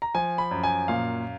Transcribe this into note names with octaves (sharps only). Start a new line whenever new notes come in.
A#5
F3 G#5
B5
F#2
G#5
A#2 F5